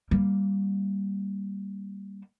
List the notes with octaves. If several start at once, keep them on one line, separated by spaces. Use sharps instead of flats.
G3 A#3